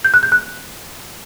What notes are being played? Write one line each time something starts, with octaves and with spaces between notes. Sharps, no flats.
G6
F#6
G6
F#6